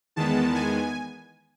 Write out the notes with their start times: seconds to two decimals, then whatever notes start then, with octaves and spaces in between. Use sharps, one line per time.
0.16 E2 D#3 G#3 B3 A5
0.55 G#5